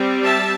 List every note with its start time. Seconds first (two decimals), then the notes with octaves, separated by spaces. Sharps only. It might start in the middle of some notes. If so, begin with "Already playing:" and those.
Already playing: G3 C4
0.25 E5 A5